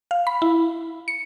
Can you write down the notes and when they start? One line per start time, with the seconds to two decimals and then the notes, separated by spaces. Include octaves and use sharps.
0.11 F5
0.27 B5
0.42 E4
1.08 C#7